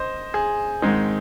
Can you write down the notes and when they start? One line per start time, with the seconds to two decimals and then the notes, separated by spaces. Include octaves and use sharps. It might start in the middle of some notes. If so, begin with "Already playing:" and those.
Already playing: C5 D#5
0.34 G#4
0.82 G#2 D#3 G#3 C4 D#4